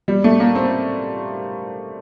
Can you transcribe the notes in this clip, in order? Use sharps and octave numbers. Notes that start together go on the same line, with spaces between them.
G3
A3
A#3
C4